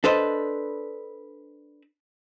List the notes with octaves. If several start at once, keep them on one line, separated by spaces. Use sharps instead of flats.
D4 A4 B4 C5 D#5